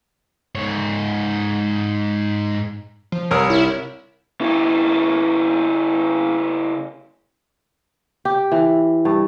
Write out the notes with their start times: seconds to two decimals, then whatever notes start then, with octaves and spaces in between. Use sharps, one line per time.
0.55 G#2 C#5
3.12 F3
3.31 C2 A#4 C#5 D#6
3.50 E4
4.41 C#3 E4
8.25 G4
8.52 E3
9.05 G2